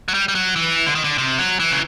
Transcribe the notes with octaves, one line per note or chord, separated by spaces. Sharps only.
F#3
G3
G3
F#3
E3
D3
D#3
D3
C3
F#3
E3
C#3